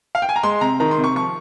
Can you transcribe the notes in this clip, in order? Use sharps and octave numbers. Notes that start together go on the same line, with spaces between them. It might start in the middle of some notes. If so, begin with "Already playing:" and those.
F5
G5
G#5
A#5
G#3 C6
C3 A#5
D#3 A#5
C6
C3
C#6
F3 C#6